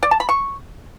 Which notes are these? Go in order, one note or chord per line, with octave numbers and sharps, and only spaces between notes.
D5
A5
B5
C#6